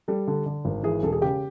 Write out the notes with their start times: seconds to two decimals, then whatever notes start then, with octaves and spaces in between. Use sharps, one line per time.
0.08 G3 A4
0.28 D3
0.46 D3
0.65 G#1
0.83 E3 G#4
1.03 E1 A4
1.13 G#4
1.21 C#3 G4